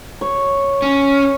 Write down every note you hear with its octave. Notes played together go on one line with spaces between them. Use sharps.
C#5
C#4